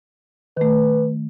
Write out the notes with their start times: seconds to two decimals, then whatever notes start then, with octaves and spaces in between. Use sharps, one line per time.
0.57 D#3 A3 B4